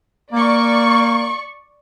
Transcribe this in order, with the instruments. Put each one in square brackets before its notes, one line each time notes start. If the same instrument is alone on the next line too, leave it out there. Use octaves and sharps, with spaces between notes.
[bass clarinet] A#3 [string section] D5 C#6